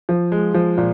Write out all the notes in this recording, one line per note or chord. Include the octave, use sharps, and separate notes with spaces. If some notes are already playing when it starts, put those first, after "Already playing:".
F3
G#3
F3
A#2